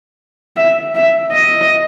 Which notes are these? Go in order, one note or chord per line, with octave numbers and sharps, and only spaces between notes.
E5
E5
D#5